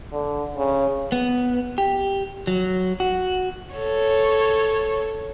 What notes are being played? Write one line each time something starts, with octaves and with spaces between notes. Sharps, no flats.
D3
C#3
B3
G4
F#3
F#4
A4 C#5